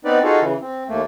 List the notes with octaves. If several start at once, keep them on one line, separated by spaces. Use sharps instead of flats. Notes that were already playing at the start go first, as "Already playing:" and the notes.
B3 C4 D#4 B4 D5
D#4 F4 F#4 G#4 A4
C#3 E3
C4
D#2 A3 A#3